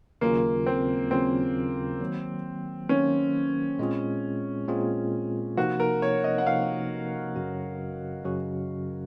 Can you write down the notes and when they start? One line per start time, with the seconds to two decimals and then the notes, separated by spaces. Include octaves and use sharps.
0.21 D#2 C#3 F#3 A#3 C#4 F4
0.66 C4
1.11 D#2 C#3 F#3 C4 C#4 F4
2.00 D#3 F#3 A#3
2.89 D#3 F#3 A#3 C#4
3.79 A#2 G#3 C4 F4 G#4
4.68 A#2 G#3 C4 F4 G#4
5.57 C3 F3 A#3 D#4 F#4
5.80 A#4
6.02 C#5
6.24 D#5
6.38 F#5
6.46 C3 F3 A#3 D#4 F5
7.36 F#2 C#3 F#3 C#4 F#4
8.25 F#2 C#3 F#3 C#4 F#4